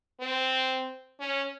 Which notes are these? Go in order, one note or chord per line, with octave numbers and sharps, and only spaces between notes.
C4
C#4